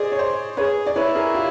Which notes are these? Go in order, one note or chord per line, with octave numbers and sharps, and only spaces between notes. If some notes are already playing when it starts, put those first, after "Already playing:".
Already playing: G#4 C5 D5 D#5
C#5
C5 D5
G#4 B4 C#5
D5
E4 B4 C#5
G#4 A#4
F4 G4